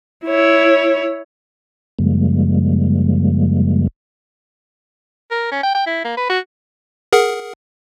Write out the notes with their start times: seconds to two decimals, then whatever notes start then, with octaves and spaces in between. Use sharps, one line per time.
0.24 E4 C#5
1.99 F#2 C#3 F3 G3 G#3 A#3
5.31 A#4
5.51 C#4
5.63 G5
5.75 G5
5.87 E4
6.05 A#3
6.17 B4
6.30 F#4
7.13 G#4 A#4 F#5